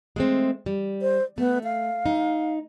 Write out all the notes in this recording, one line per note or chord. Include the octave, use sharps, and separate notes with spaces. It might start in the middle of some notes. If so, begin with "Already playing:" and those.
G#3 A3 C4
G3
C5
A3 B3
F5
D#4